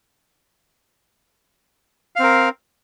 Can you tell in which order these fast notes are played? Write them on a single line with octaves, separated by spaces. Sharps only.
F5 C4 A#4